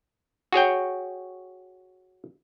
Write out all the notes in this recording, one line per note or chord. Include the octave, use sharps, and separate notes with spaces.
F#4 G#4 C#5 G5